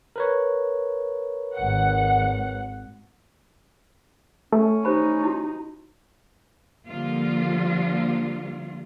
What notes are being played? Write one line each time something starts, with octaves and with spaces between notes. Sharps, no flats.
A#4 B4 C#5
G#1 F#5
A3 C#4
D#4 G4 C5 B5
E4 F#4
D3 F3 G3 A#3 F4